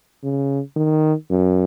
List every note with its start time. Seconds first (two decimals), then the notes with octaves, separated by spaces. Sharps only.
0.23 C#3
0.76 D#3
1.30 F#2